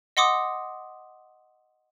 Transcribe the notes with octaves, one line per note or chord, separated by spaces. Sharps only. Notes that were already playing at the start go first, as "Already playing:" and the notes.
D#5 F#5 C6 D6 D#6